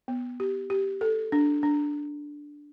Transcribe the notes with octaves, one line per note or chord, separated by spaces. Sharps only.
B3
G4
G4
A4
D4
D4